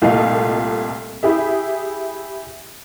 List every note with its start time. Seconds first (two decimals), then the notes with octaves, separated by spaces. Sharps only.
0.02 C2 A#2 A3 A4 D#5 F5
1.23 E4 G4 G#4 E5